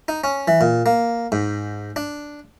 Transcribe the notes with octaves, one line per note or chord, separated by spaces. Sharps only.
D#4
C#4
E3
A#2
A#3
G#2
D4